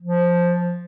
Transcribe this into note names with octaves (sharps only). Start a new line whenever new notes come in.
F3